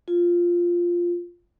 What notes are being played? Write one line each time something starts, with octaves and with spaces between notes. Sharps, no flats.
F4